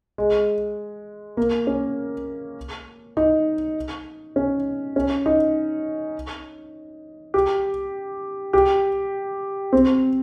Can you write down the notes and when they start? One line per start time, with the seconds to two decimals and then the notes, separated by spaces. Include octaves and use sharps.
0.18 G#3
1.37 A#3
1.67 C#4
3.17 D#4
4.36 C#4
4.96 C#4
5.26 D#4
7.34 G4
8.53 G4
9.73 C4